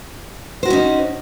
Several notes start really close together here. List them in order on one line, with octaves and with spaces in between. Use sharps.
C5 F#4 E4 C#4 D#4